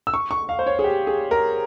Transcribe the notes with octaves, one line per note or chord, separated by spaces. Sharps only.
E6
C#6
C#6
F5
C5
C#5
G#4
G4
G#4
A#4